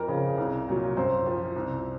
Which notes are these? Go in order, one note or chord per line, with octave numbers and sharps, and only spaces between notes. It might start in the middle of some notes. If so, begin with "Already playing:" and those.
Already playing: F2 A#4
C#3 F3
C2
A#2 F#3
F#2 C5
F3
C2